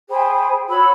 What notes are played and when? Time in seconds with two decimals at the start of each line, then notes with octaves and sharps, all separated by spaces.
0.09 G#4 C5 G5 B5
0.69 F#4 C#5 B5 E6